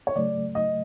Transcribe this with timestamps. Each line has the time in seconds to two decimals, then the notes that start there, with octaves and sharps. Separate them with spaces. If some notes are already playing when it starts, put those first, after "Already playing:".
0.07 C#5
0.16 C#3 F#3 A3 D5
0.55 D#5